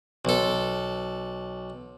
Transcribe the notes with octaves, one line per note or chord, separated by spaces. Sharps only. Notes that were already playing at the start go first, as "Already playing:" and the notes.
B1 A4